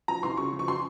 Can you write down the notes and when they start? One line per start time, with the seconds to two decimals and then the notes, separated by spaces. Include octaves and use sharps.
0.08 F3 A#5
0.23 C2 C6
0.37 C#3 C#6
0.53 F3
0.59 C#6
0.68 C6